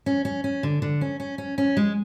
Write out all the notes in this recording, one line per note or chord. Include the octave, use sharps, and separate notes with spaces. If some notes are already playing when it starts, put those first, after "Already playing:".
C#4
C#4
C#4
D3
D3
C#4
C#4
C#4
C#4
G#3